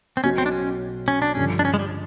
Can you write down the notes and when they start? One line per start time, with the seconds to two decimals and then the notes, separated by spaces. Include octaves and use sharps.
0.17 C4
0.24 B1 B2 F#3 C#4
0.38 C4
0.46 D4
0.52 C#4
1.08 C#4
1.22 D4
1.35 G2 D3 F3 C#4
1.59 D4
1.65 C#4
1.74 G#3
1.79 G3